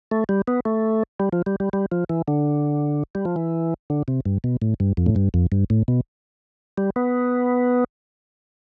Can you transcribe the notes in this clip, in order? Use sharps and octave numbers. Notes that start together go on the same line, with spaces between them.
A3
G3
B3
A3
G3
F3
G3
G3
G3
F3
E3
D3
G3
F3
E3
D3
C3
G2
B2
A2
G2
F2
A2
G2
F2
G2
A2
B2
G3
B3